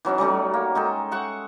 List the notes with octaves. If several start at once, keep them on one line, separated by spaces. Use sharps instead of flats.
E3 F#3 C#4 D#4
F#3 G3 A3 C#4
A#3
G#3 D#4 A4 G5
E5 F#5 C#6